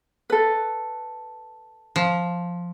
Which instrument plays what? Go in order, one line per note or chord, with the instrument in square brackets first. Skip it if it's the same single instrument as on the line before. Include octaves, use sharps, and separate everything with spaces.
[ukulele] A4 B4
[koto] F3